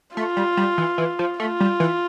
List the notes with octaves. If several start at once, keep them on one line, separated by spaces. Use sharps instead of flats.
A3 F4
G3
G3
E3
E3
F3
A3 F4
G3
E3